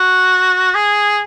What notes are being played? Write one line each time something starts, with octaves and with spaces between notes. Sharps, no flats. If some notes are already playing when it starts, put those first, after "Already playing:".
Already playing: F#4
G#4